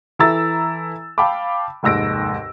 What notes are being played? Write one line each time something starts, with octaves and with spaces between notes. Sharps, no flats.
E3 E4 A4 A#5 E6 A6
F5 G5 A5 B5 D6
F1 D#2 G#2 E6 A#6 D7